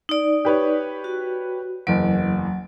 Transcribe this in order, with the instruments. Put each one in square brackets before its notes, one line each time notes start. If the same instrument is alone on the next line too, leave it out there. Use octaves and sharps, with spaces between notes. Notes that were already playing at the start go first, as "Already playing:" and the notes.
[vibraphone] D#4 D5
[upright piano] G4 B4 C#5
[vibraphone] F#4
[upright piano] F#1 E2 D7 [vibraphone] F#3